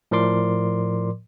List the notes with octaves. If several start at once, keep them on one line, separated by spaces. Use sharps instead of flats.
A2 F3 A#4 D5 C6 D6